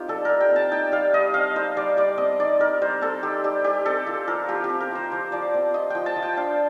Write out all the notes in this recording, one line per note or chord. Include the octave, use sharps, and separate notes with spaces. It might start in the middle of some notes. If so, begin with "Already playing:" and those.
Already playing: C4 D#4 F4 G4
G3 A4
G3 A#4
G5
C4
A5
D#4 G5
G3 F5
G3 D#5
C4 F5
D#4 C5
G3 D5
G3 D5
C4 D#5
D#4 D5
G3 A#4
G3 C5
C4 A4
D#4 G4
G3 G4
G3 G4
C4 A4
F4 A4
F3 A#4
F3 G4
G4
C4
A#4
F4 C5
F3 C5
F3 D5
C4
F4 D#5
F3 G5
A5
F3
G5
D4 F5